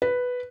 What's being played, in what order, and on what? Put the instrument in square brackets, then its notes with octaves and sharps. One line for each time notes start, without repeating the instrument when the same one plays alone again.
[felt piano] B4